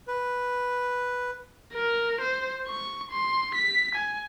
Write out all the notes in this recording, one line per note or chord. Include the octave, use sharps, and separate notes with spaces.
B4
A#4
C5
C#6
C6
B6
G#5